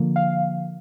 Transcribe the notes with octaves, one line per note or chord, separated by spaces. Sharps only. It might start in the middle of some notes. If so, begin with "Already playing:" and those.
Already playing: D3 F3 A#3
F5